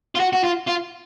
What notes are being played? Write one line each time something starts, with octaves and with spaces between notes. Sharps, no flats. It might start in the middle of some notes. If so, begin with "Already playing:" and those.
F4
F#4
F#4
F4
F4